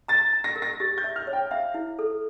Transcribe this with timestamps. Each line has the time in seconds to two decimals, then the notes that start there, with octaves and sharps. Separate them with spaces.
0.08 A#5 A6
0.33 A#5
0.44 A#6
0.56 A#4
0.62 A#6
0.80 G4 A6
0.98 G6
1.04 E5
1.16 F6
1.27 C#5
1.33 G5
1.51 E5 F5
1.74 E4
1.99 A4